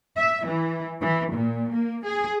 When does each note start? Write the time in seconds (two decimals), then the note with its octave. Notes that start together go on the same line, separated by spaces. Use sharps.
0.18 E5
0.47 E3
1.01 E3
1.32 A#2
1.72 A#3
2.06 G#4